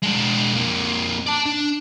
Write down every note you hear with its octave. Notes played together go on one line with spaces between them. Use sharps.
G#3 D4
F2 A#3
D5 A5
D4